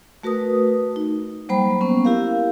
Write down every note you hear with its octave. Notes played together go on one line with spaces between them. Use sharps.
A3 F#4 A#4 B4 D#6
D#4
F#3 G3 A#3 C5 G5 B5
A#3 B3 C#4
E4 G4 A#4 F5